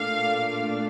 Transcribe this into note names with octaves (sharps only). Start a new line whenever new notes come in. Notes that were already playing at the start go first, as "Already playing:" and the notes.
Already playing: A#2 A3 D4 F5